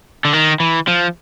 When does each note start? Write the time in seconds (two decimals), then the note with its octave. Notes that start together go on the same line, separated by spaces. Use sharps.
0.25 D3
0.33 D#3
0.60 E3
0.88 F3